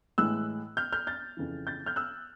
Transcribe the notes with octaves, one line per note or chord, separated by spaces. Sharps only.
A2 E3 G#3 E6 F#6
F6 G6
F6 G6
G6 A6
F2 C#3 E3
G6 A6
F6 G6
E6 F#6